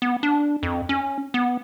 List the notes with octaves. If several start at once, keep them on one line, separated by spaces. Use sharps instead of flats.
B3
D4
F2
C#4
B3